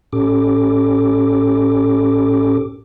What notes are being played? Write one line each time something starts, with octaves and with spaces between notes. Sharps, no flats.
A2 C#4 G4 A4 D6